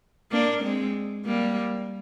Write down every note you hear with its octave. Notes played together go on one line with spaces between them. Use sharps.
A#3 D4
G#3 C4
G3 A#3